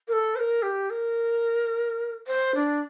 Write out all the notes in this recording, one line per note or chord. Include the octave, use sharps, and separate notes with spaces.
A#4
A4
C5
A#4
G4
A#4
C5
D4